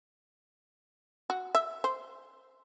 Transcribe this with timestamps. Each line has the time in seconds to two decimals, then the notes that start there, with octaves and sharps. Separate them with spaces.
1.30 F#4
1.55 E5
1.84 C5